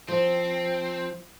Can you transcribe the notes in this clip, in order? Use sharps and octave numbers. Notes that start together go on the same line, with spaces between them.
F3 C4